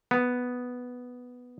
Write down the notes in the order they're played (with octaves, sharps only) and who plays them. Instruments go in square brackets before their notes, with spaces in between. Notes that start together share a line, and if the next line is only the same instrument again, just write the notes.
[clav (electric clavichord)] B3